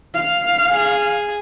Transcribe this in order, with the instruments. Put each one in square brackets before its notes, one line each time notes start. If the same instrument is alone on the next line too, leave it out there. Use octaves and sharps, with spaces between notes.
[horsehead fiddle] F5
[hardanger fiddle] G#4